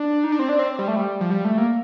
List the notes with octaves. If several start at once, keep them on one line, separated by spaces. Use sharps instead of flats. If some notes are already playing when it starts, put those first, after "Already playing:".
Already playing: D4
D#4
D4
C4
D4
C4
G3
A3
G3
F3
G3
A3
A#3